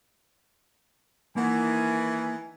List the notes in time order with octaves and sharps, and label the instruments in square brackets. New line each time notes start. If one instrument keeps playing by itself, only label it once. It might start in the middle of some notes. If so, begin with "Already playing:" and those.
[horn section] D#3 E3 [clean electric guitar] A#3 F#5 [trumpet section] G#5